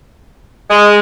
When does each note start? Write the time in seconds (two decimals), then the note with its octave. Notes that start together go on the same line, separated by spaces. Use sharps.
0.70 G#3